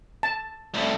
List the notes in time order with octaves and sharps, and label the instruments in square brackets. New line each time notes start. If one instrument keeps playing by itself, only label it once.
[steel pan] A5
[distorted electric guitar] C2 A2